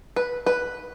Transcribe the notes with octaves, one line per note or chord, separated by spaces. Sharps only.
B4
B4